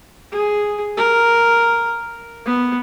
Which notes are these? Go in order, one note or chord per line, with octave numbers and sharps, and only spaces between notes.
G#4
A#4
B3